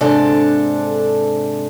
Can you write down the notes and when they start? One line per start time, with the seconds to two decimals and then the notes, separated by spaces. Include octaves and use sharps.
0.01 G#2 C3 D4 A4